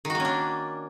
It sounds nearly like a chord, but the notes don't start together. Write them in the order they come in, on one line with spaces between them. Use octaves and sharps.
D#3 F#4 A#3 C#4 D4